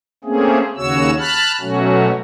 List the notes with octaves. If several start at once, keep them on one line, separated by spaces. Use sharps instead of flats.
A3 A#3 C4 C#4 G#4
D#2 C#3 F#4 C#5 E6
A5 B5 F6 F#6
B2 F#3 A3 C#4 F#4